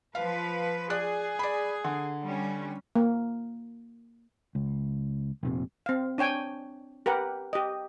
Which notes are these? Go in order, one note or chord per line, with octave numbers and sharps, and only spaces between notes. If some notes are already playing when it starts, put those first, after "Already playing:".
F3 B4 F5
G#4 D5 F#6
D5 B5
D3
G3 C#4
A#3
C#2
F1 A#1 C3
C4 F5
D4 C#5 G5 G#5
G4 A#4 B4 F#5
G4 D#5